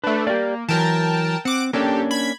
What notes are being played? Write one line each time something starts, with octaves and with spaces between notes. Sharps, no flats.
A3 D4 B4
A#3 G4 D5
E3 F#3 A#4 G5 A5
C4 F#5 D6
A#3 C#4 D4 G4 A4
B5 G#6